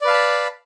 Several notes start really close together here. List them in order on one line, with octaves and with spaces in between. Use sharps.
D5 B4 F5 A5 B5